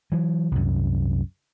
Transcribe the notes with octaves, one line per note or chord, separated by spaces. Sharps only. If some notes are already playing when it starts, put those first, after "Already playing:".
E3 F#3
C2 F#2